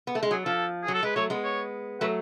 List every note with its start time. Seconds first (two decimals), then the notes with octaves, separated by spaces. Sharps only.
0.07 B3
0.15 A3
0.23 G#3
0.31 F#3 G#4
0.45 F3 A4
0.84 F#3 G#4
0.94 A4
1.03 G#3 B4
1.16 F#3 A3 C#5
1.30 G#3 B3
1.44 C#5
2.01 F#3 A3 B4